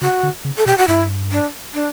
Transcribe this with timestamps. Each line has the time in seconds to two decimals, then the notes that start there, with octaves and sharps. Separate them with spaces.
0.02 C#3 F#4
0.23 D3
0.45 C#3
0.57 A4
0.66 B2 G4
0.78 F#4
0.88 G2 E4
1.32 D4
1.74 D4